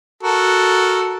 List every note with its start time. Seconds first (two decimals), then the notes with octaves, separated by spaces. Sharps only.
0.23 F#4 A4 A#4